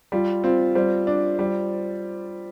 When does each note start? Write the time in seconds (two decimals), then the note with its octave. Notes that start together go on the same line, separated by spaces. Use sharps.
0.12 G3 F4
0.44 C4 F4
0.75 G3 C5
1.07 D4
1.39 G3